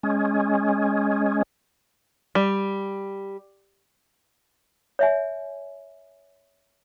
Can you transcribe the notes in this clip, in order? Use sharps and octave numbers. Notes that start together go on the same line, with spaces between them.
G#3 C#4
G3
C#5 E5 G#5